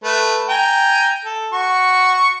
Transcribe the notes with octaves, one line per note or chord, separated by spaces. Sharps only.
A3 B4
G5 G#5 A#5
A4
F#4 C#6